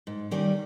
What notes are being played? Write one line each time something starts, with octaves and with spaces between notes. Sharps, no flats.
G#2
D#3 G3 C#4